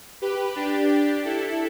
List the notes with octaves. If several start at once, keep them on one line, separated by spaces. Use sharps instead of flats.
G4 B4
D4 G4
E4 A4